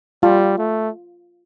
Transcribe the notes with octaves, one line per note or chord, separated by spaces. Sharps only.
G3 F4
A3